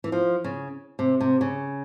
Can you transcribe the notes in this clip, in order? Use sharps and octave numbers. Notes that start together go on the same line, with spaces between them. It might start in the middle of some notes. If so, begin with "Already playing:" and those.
E3
F3
C#3
C3
C3
C#3